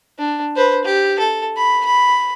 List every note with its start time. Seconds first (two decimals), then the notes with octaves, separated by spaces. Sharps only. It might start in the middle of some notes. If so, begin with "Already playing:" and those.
0.18 D4
0.56 B4 C5
0.84 G4
1.18 A4
1.57 B5
1.85 B5